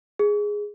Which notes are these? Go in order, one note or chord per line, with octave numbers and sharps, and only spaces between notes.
G#4